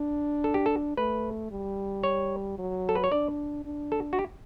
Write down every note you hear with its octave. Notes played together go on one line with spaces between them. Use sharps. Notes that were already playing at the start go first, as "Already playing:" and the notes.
Already playing: D4
A4
G4
A4
A3 B4
G3
C#5
F#3
A4
B4
C#5
D4 D5
D4
A4
F#4
G4